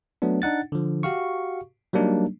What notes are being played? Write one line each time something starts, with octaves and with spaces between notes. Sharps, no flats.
F#3 A3 B3 D4
D4 D#4 F#5 A6
D3 F3
F#4 G4 F5 C#6
F#3 G3 A#3 D4 D#4